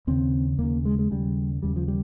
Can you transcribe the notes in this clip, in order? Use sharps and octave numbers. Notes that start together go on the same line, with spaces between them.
D#2 C#3 C4
D#2 C#3 A#3
G#3
G#3
D#2 C#3 G3
D#2 C#3 G3
F3
G3